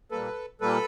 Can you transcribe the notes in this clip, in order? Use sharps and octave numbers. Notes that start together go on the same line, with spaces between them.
A#2 G3 A#3 A4 B4
A#2 G3 A#3 A4 B4